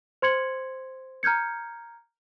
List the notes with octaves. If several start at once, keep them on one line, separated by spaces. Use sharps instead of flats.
C5 C6 G#6 C#7 F#7
A#5 F6 G6 G#6 C#7